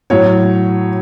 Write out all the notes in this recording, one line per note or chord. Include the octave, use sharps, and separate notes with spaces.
A2 F#3 C#5